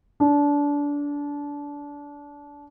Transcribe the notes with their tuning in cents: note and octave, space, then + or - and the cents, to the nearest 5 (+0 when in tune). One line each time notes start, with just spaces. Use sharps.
D4 -25